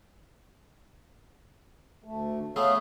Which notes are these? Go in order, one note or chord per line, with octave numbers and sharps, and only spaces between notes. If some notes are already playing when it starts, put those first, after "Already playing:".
D2 A3
A3 B3 G#4 C#5 E5 F5